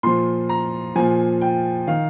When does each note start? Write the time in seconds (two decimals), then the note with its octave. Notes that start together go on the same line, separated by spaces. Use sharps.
0.03 A#2 F3 C6
0.49 A#5
0.95 A#2 F3 G#5
1.41 G5
1.87 D#3 F5